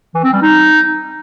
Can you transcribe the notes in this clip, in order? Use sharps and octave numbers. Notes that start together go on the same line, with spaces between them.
E3
C4
G3
D#4